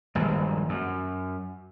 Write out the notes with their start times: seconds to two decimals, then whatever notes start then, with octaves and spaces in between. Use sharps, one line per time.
0.15 A#1 G2 D#3 G#3
0.69 F#2